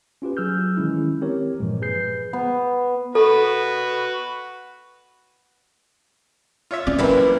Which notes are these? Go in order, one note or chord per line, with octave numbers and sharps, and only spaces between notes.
C#4 F4 G4 B4
F#3 G#4 E6 F6 G6
D#3 E3 G#3 C#4 E4
C4 G4 A#4 C#5
G2 A#2 E3 F3 G#3
G#4 B4 G6 C7
B3
F#4 A4 B4
F4 C#5 E5
C#4 D5
F#2 E3 A#3 C4 E4 B4 B5
C2 D5